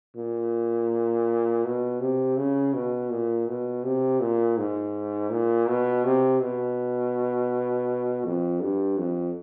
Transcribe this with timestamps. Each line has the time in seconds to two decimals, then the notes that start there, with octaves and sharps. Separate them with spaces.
0.16 A#2
1.64 B2
2.00 C3
2.37 C#3
2.74 B2
3.10 A#2
3.48 B2
3.84 C3
4.20 A#2
4.58 G#2
5.30 A#2
5.68 B2
6.04 C3
6.41 B2
8.25 F2
8.62 G2
8.98 F2